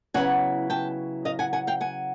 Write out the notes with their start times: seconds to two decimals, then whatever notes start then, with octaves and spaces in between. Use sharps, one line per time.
0.14 C#3 F#3 B3 E4 F#5 G#5
0.70 G5 A5
1.25 D#5 F5
1.39 F#5 G#5
1.53 F#5 G#5
1.67 F5 G5
1.81 F#5 G#5